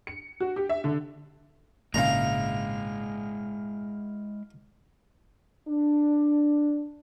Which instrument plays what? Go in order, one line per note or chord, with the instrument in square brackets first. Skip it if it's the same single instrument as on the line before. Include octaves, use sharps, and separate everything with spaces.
[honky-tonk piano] C#7
F#4
G4
E5
D3
[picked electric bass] G#1 A#2 C#3 [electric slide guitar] G#3 E4 [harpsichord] F5 A#5
[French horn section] D4